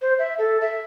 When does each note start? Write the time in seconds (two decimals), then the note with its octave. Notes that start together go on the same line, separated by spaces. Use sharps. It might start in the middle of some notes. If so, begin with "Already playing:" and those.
0.02 C5
0.19 E5
0.39 A4
0.61 E5